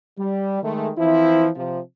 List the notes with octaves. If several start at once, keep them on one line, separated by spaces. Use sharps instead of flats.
G3
D#3 G#3 A3
E3 F3 C4 E4
C3 F3